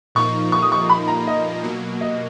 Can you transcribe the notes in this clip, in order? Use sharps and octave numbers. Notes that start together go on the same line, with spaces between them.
A#2 F3 A#3 D#4 C#6
C#6
D#6
C#6
B5
A#5
D#5
B2 F#3 A#3
D#5